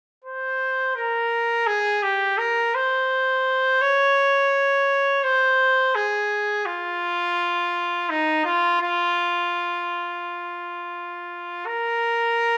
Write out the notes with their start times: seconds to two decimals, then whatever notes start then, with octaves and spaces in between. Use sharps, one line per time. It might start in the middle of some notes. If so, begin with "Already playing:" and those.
0.24 C5
0.96 A#4
1.67 G#4
2.03 G4
2.38 A#4
2.75 C5
3.81 C#5
5.23 C5
5.95 G#4
6.66 F4
8.10 D#4
8.45 F4
8.81 F4
11.66 A#4